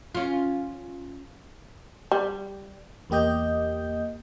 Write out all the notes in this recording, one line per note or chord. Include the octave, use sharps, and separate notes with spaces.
C#4 F4
G3
E2 A#3 G4 D#5 G6